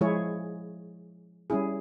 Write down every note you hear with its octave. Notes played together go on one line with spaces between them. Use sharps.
F3 G#3 E4 G#4 C#5
G3 C#4 E4 G#4